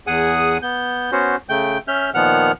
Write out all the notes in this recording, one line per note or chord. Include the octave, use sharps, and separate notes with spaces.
E2 G#4 F#5 G#5 D#6
B3 G6
B3 C#4 F#4 C5
C#3 A3 G5 G6
C#4 E5 F6 G6
A#2 D#3 F3 B3 F#5 F6